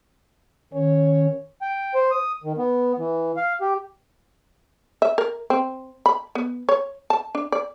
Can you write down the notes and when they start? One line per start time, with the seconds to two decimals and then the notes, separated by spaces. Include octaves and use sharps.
0.73 D#3 C#4 C#5
1.62 G5
1.94 C5
2.11 D#6
2.44 D#3
2.58 B3
2.98 E3
3.37 F5
3.61 G4
5.02 E5
5.18 A#4
5.50 C4
6.06 B5
6.35 B3
6.69 C#5
7.10 A5
7.35 D4
7.52 D5